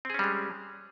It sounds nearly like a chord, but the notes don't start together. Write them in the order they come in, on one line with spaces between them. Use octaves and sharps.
C4 G#4 C#4 G3 G#3